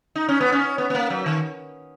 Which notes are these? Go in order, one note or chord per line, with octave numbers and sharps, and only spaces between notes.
D#4
C#4
B3
C#4
B3
B3
A#3
F#3
D#3